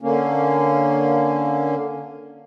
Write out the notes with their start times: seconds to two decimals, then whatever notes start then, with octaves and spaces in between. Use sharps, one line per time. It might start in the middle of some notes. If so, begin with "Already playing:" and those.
0.02 D3 A#3 C#4